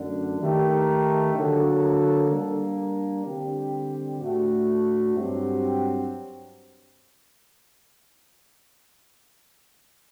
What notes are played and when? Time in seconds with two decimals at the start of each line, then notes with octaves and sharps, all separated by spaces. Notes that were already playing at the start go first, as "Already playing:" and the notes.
Already playing: F#2 D3 A3 D4
0.40 D#3 A3 D#4 G4 A#4
1.35 D3 F#3 A#3 F#4 A4
2.30 G3 A#3 D4
3.25 D3 G3 C4 G4
4.21 A2 A3 D4 F#4
5.16 G2 F#3 C4 G4